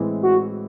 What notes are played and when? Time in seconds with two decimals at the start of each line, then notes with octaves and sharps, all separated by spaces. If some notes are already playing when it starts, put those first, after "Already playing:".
Already playing: A2 E3 G#3 C4
0.23 F#4